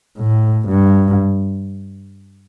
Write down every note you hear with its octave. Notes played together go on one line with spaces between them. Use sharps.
A2
G2